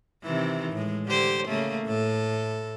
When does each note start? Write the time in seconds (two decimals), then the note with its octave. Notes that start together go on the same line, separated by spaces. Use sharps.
0.23 C3 D#3 E3
0.73 A2 G#3
1.06 D3 G4 C5
1.48 C#3 A3 A#3
1.85 A2 A4